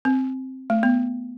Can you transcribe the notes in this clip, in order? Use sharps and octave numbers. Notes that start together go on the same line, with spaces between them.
C4
A3
B3